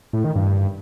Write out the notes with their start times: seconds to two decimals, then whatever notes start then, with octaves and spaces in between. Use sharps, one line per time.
0.13 A2
0.24 D#3
0.36 G2